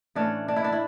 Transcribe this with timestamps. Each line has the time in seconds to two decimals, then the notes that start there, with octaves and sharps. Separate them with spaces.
0.15 A2 E3 A3 C#4 D4
0.48 D4
0.56 E4
0.64 D4
0.72 E4